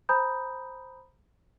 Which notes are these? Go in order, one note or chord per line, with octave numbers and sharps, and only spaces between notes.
C5 G#5 A#5 B5 D#6 G6